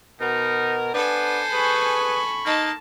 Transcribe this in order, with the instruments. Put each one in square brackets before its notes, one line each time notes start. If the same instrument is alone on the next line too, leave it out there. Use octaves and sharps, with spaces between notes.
[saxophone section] B2 A#4 [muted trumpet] D#4
[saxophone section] B3 D4 B4 [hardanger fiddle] A4 G#5 [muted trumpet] C5
[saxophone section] G#4 B4 [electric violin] B5 C#6
[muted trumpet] A#3 [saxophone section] D#4 [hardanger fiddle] A5